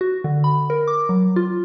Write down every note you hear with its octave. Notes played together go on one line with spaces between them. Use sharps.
F#4
D3
B5
A#4
D6
F#3
F4